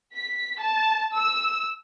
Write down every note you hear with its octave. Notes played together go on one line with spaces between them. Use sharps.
B6
A5
E6